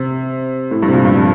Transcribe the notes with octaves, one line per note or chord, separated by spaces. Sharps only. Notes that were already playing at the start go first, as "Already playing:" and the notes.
Already playing: C3
A2
G2
C3
A#2
G2
F3